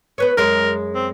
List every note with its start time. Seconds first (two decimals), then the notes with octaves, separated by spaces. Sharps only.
0.18 B3 B4 C#5
0.37 F#2 G#3 A#4
0.95 C4